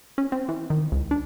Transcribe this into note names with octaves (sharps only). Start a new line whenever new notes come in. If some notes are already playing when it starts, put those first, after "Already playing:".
C#4
C4
E3
D#3
C#2
D4